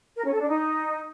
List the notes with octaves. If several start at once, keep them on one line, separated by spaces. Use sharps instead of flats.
A#4
C#4
A4
D4
D#4